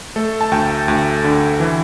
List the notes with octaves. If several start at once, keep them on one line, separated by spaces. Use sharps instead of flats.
A3 A4
A5
D2 G5
D2
D3
E3